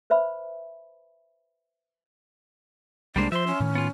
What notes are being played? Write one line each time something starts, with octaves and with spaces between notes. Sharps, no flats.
B4 C5 E5 B5
C2 G3 G#3 A#3 D4 C5
F3 C5 E5 C6
C#4
A2 D#3
B3 F4